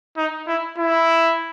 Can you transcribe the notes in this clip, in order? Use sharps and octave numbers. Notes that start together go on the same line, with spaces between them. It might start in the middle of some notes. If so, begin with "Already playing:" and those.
D#4
E4
E4